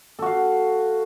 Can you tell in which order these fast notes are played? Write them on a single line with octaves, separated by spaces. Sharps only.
A4 F#4 F5